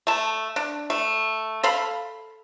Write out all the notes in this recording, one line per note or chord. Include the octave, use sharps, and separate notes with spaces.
A3 A5
D4
A3
A4 F5 B5